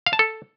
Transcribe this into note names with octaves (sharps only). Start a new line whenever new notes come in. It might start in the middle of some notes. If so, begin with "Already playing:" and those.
F5
A5
A4